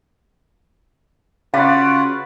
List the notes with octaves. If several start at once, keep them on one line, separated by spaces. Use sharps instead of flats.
C#3 F4 F#4 B4 C#5 D5 F5 F#5